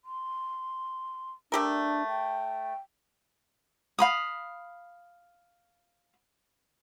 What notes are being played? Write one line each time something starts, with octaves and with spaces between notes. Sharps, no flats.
C6
A3 D4 G4 A#4
G5
F5 B5 D#6